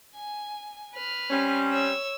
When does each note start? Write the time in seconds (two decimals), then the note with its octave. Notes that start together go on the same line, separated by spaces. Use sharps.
0.15 G#5
0.94 B4 F6
1.31 G3 C4 C#4
1.71 C#5 E6